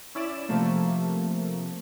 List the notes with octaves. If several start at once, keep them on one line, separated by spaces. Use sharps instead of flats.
C#4 E4 D5 E7
C3 F3 A3 A#3